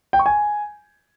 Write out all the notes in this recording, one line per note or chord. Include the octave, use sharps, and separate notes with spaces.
G5
C#6
G#5